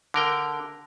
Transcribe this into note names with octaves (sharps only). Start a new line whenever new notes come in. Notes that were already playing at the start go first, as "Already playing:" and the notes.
D3 A#4 G5